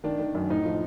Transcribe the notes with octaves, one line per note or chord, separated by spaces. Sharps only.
D#3 D4
D#3
F#2
A2 D#4
F3